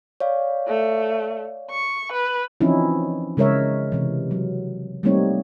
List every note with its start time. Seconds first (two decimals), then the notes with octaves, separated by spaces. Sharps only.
0.20 C#5 D5 F5
0.67 A3
1.71 C#6
2.12 B4
2.61 E3 F3 C4 C#4 D#4 E4
3.37 C#3 G#3 A#4 C#5 E5
3.92 C3 E3
4.31 F#3
5.03 G3 A3 A#3 C4 D#4 C#5